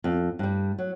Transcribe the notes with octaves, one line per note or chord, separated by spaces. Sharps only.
F2
G2 G3
F#3